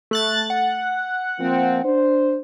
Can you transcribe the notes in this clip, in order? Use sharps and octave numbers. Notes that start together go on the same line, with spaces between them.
A3 F#6 A6
F#5
F3 A#3 C4
D4 C5